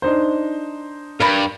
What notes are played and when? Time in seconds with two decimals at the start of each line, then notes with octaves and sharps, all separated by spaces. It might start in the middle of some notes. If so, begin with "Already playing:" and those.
0.02 D4 D#4 C5
1.20 G2 A#4 D5 B5